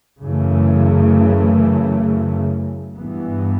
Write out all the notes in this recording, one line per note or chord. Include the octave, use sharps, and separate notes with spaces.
F#2 C#3 E3 A3
G2 E3 B3